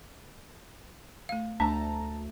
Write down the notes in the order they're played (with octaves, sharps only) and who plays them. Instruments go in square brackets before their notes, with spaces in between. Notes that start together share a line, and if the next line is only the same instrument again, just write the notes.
[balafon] A3 F5
[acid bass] D2 [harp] A3 [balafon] D4 [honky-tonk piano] A5 A#5